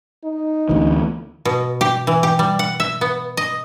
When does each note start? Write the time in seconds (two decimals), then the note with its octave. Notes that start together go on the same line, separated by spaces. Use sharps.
0.24 D#4
0.69 D2 E3
1.45 B2
1.81 G4
2.07 E3
2.23 G4
2.39 G3
2.59 F#5
2.80 E5
3.01 B3
3.37 D#5